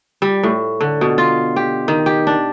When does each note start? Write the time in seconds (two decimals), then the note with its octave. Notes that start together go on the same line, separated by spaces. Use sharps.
0.22 G3
0.43 A2
0.81 D3
1.01 B2
1.18 F4
1.56 G4
1.88 D#3
2.06 G4
2.27 D4